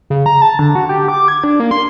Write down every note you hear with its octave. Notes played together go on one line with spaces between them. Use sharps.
C#3
A#5
A5
D3
F#4
G4
D6
G#6
D4
A#3
C6